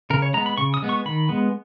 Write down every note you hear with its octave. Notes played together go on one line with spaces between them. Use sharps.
C#3 A#4
C#5
G#3 B3 A#5
B5
C#3 C#6
D#6
G#3 B3
C#6
D#3 B5
G#3 B3